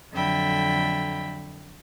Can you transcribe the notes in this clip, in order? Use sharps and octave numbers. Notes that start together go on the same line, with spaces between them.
F2 D3 F#3 E5 G5 B5